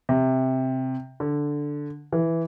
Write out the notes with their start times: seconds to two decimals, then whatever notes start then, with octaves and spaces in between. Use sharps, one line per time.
0.09 C3
1.20 D3
2.12 E3